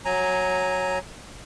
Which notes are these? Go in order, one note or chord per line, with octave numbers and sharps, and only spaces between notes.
F#3 G#5 A#5